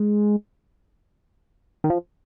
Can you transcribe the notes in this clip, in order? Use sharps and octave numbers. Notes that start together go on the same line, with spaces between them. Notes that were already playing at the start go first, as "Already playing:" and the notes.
Already playing: G#3
D#3
F3